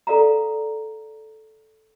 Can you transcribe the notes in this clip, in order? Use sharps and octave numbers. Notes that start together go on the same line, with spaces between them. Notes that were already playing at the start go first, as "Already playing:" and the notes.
A4 D5 F5 A#5